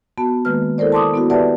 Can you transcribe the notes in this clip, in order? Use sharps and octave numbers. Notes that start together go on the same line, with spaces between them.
B3 F#4 A5
D#3 G#3 A#3 B4 F6
E4 A4 A#4 C5 D5
A5 C6 D6 D#6
B3 E4 F#4
G4 B4 D5 E5 F#5 A5